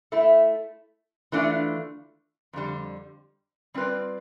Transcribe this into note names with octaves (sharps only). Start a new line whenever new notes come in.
A3 E4 A4 E5
E3 A3 D4 F4
F2 D3 G3
G3 C4 F4 B4 D5